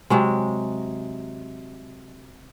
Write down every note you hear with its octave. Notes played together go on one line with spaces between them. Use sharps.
C3 F#3 G#3